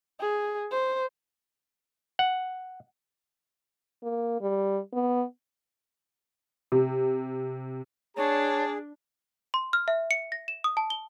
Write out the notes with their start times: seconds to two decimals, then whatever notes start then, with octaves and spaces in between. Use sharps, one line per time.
0.20 G#4
0.72 C5
2.19 F#5
4.03 A#3
4.41 G3
4.93 B3
6.72 C3
8.17 D4 G#4 C#5 A5
9.54 C6
9.73 F6
9.88 E5
10.11 C#7
10.32 A#6
10.48 E7
10.64 D#6
10.77 A5
10.90 G7